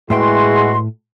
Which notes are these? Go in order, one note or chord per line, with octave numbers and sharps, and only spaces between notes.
E2 A2 G#3 E4 F#4 E5 G5 C6